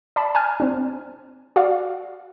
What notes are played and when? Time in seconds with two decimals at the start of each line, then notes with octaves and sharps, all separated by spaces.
0.16 D5 A5 B5
0.35 G#5 A5 F6
0.60 C4 D4
1.56 F#4 D5 F5